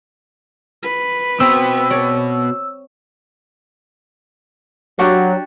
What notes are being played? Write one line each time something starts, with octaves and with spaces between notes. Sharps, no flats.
B4
B2 C4 E6
C#5 D5
F#3 D4 F#4 G4